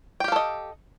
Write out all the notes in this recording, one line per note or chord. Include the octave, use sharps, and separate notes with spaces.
G4 A4 D#5 F5 G5